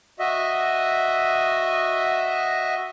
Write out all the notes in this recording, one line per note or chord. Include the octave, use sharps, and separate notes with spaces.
F#4 D#5 E5